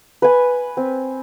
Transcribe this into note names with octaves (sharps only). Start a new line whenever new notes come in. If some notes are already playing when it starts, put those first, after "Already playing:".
B4 G#5
C4